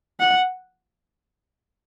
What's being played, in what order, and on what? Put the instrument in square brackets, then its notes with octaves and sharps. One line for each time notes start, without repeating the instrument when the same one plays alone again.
[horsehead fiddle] F#5